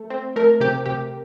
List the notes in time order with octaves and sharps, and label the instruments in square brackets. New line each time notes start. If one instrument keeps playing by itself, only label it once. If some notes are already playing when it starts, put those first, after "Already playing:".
Already playing: [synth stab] A3
C4
A3 A#4
C3 G4
C3 G4